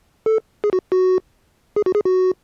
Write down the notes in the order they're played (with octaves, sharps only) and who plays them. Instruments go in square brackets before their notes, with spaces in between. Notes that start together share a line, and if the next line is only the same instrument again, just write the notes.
[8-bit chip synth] A4
G#4
F#4
F#4
G#4
F#4
G#4
F#4